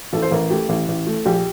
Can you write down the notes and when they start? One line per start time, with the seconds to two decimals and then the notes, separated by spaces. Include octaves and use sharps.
0.13 A1 A4
0.22 C5
0.31 A1 A#4
0.50 A3 G4
0.69 A1
0.88 A1
1.07 A3
1.25 A#1 G4